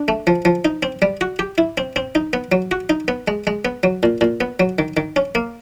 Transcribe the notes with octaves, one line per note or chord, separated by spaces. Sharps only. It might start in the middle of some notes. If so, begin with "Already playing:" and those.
Already playing: D4
A3
F3
F3
D#4
C4
G3
F#4
G4
E4
C4
C4
D#4
B3
F#3
F#4
D#4
B3
G#3
G#3
B3
F#3
A#2
A#2
B3
F#3
D#3
D#3
C#4
A#3